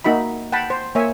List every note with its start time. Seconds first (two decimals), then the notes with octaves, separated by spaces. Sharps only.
0.04 A#3 D#4 F#4 E5 B5
0.52 F#5 G5 A5 B5
0.70 C5
0.95 A#3 C#5 E5 G#5